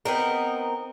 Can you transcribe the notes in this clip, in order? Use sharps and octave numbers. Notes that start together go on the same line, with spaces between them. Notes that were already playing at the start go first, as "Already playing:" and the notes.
B3 C4 D#4 A#4